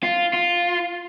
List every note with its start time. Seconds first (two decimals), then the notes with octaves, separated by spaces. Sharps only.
0.03 F4
0.33 F4